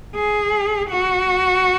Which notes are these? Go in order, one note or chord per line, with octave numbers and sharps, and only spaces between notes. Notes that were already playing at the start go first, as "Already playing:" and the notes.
G#4
F#4